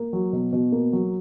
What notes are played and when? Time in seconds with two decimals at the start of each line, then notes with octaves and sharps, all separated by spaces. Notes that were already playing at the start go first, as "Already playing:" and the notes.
Already playing: A#3
0.13 F#3
0.33 B2
0.53 B2
0.72 A#3
0.93 F#3